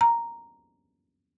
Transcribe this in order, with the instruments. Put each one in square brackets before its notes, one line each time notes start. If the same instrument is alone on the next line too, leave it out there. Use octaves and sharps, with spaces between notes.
[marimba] A#5